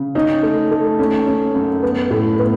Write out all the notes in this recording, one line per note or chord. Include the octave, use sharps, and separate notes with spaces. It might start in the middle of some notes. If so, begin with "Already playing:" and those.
Already playing: C#3
C#4 D#4
A3
A3
C#4
C#4
F#2
B3
A2
B3